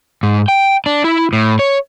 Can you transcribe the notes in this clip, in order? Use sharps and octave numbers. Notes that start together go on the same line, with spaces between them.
G#2
G5
D4
E4
A2
C#5